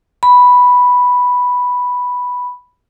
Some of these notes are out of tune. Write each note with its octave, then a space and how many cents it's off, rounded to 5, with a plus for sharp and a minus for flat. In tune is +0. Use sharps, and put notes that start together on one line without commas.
B5 -5